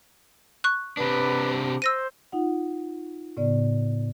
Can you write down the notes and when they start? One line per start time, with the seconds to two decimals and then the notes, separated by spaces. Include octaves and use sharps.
0.64 C#6 F#6
0.97 C3 D4 B4
1.82 C5 E6 A#6 D#7
2.32 D#4 F4 F#5
3.37 A2 C#3 B3 D5